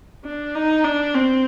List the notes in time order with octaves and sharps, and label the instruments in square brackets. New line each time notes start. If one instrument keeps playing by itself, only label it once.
[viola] D4
D#4
D4
C4